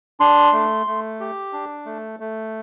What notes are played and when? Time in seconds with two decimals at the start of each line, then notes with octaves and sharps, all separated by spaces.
0.20 D4 C6
0.53 A3
0.86 A3
1.20 G4
1.53 D4
1.86 A3
2.20 A3